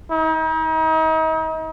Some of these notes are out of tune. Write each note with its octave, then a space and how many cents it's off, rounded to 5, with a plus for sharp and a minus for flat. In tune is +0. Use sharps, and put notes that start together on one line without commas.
D#4 +40